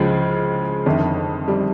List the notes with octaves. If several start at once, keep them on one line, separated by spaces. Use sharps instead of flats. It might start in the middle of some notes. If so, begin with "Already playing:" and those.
Already playing: C#2 C#3 F3 G#3
G1 F2 D#3
G3